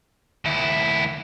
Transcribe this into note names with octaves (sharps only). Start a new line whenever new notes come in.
D#2 E4